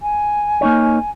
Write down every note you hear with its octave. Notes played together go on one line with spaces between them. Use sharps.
G#5
A#3 D#4 C#5